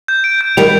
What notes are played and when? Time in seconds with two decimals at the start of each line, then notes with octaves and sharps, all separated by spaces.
0.08 G6
0.24 D7
0.41 G6
0.57 D#3 G3 F7